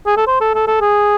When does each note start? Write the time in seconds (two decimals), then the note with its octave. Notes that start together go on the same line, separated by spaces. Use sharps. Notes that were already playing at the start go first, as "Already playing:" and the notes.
0.07 G#4
0.17 A4
0.27 C5
0.41 A4
0.55 A4
0.67 A4
0.81 G#4